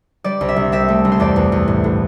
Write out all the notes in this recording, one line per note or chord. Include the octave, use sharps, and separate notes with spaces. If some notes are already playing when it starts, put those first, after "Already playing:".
G3 D5
C2
E5
C2
C4 E5
A3
C2
C5
E2 D5
E2
E2
A2
A2